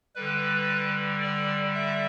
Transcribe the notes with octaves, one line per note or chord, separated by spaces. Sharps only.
D3 G3 B4
D5
E5